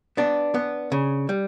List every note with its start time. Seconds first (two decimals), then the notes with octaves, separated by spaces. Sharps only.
0.17 B3 D4
0.54 B3
0.92 C#3
1.29 G3